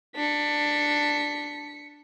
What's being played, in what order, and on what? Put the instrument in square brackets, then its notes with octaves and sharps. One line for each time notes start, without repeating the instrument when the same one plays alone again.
[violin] D4 [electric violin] B6 C#7